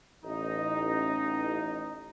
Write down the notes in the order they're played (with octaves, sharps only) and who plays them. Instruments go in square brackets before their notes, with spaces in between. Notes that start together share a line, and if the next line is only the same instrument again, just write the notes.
[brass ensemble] A1 D#4